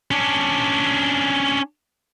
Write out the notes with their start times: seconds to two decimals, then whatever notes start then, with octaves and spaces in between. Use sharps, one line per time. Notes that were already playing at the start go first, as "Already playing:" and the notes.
0.11 C#4 D4